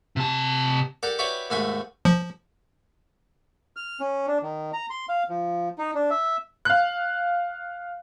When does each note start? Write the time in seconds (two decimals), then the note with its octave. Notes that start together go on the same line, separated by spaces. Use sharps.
0.16 C3 A5
1.03 G4 A4 A#4 D5 F#5
1.19 E4 F#4 G4 B4 C#5 D5
1.50 D#2 G#2 A3 F#4 G#5 B5
2.05 F3
3.76 F6
4.00 C#4
4.27 D4
4.43 D#3
4.73 A#5
4.90 C6
5.09 F5
5.29 F3
5.78 D#4
5.95 D4
6.10 E5
6.65 F5 F#6